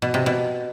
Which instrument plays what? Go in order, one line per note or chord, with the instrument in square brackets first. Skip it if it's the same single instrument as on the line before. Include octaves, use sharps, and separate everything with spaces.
[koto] B2
C3
B2